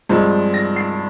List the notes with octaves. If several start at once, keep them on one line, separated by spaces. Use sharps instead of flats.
G2 F3 G#3 C4
A#6
C7